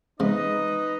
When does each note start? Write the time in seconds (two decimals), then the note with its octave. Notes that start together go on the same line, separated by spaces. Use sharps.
0.20 C3 G#3 D#4 B4 D#5